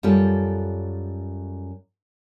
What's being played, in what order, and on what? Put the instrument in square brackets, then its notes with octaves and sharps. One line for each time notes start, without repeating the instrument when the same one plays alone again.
[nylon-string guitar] F#2 G3 F4 A4